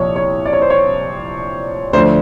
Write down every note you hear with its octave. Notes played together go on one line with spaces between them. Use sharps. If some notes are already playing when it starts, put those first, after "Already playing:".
Already playing: C2 A#2 F3 C#5
C#5
D5
C#5
C5
C#5
D2 D3 F3 C5